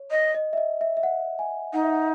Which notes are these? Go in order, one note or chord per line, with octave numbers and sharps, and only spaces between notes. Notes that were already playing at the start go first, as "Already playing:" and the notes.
Already playing: C#5
D#5
D#5
E5
D#5
E5
E5
F#5
G#5
D#4 F#5
E5
F#5